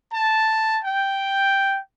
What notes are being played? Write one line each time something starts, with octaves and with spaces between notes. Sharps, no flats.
A5
G5